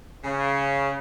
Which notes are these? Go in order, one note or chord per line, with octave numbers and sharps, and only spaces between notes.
C#3